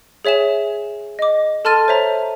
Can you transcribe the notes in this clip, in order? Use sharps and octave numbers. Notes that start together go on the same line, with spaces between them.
G#4 C#5 E5 G#5 E7
D#5 D6
A4 A5 C6 F6 A6 D#7
C5 C#5 E5 A#5